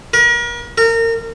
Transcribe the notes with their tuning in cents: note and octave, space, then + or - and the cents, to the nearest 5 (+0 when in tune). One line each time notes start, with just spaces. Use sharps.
A#4 +40
A#4 -30